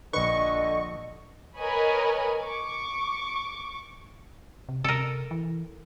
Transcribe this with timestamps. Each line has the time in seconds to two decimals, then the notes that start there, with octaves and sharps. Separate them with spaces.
0.13 A#1 D3 B4 D#5 C#6
1.58 A#4 B4 C#5 D#5 G#5 B5
2.43 C#6 D6
4.69 C3
4.84 C3 A4 A#4
5.31 E3